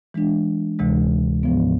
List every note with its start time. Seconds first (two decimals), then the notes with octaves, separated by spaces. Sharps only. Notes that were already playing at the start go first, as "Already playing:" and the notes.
0.14 E3 G#3 D4
0.79 D2 C3 E3 G#3
1.43 G#2 F3 B3